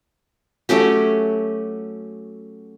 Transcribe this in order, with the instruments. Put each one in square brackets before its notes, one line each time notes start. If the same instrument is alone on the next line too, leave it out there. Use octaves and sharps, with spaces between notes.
[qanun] F#3 A3 C#4 G4